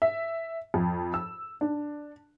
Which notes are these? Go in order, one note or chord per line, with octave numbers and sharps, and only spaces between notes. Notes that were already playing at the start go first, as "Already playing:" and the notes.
E5
F2
E6
D4